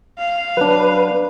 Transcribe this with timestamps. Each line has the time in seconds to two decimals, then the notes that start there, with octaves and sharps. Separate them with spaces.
0.18 F5
0.57 F#3 D4 B4